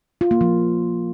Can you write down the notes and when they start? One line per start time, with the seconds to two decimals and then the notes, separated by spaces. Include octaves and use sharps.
0.21 F4
0.31 A#3
0.41 F3